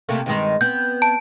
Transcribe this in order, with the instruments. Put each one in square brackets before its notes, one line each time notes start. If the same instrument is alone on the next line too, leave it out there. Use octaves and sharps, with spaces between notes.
[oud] C3 A3 A#3
G2 D#3 G#3
[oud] B3 C4 [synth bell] G6
[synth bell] A5